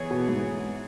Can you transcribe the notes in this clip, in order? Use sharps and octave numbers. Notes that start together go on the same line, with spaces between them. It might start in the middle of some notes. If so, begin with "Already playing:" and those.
Already playing: E3 B3 G#4 C#5
B2
G#2